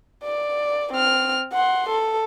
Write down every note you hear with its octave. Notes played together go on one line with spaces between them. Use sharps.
D5
C4 F6
F#5 C6
A4